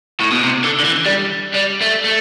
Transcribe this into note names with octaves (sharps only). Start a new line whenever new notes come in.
A2
B2
C3
D3
D3
E3
G3
G3
A3
A3